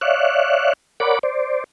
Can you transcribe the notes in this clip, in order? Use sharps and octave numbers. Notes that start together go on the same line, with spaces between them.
C#5 D5 E5 F5 F#6
A#4 C#5 D5 F#5 B5 D6
C5 D5